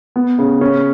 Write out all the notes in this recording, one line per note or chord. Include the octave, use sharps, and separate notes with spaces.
B3
C#3
C#4